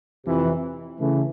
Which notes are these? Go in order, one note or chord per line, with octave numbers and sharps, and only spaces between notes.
F2 C3 E3
C#3 E3 A3